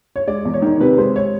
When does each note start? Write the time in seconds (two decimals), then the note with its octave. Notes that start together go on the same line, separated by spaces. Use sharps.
0.16 C#5
0.27 G#3 D5
0.45 E2
0.54 C#5
0.62 D#3
0.80 C3 B4
0.98 G#3 C5
1.16 C#5